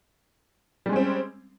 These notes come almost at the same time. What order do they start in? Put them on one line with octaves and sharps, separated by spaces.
G3 G#3 C#4 C4